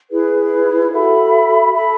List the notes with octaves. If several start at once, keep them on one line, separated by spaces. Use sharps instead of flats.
E4 G#4 B4
F#4 A4 E5 B5
A4 E5 B5